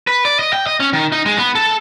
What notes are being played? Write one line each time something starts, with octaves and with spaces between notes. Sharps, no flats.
B4
D5
D#5
G5
D#5
C#4
D#3
D#4
G#3
B3
A4